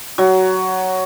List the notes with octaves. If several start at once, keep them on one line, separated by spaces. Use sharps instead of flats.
F#3